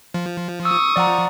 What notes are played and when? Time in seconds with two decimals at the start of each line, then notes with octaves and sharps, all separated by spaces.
0.14 F3
0.65 C#6 D#6 E6
0.96 F3 D5 F#5 A#5